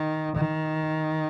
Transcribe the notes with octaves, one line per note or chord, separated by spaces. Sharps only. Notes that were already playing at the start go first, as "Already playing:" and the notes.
Already playing: D#3
D#3